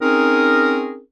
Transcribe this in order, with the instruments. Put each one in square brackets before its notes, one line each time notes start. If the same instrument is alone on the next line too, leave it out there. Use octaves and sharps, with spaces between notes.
[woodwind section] C4 C#4 D#4 G#4 A#4